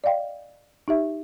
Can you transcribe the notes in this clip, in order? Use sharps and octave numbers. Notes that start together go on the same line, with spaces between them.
D5 D#5 F5 G5
D#4 G4 E5